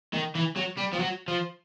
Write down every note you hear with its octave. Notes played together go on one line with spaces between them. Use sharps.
D#3
E3
F#3
G3
F3
F#3
F3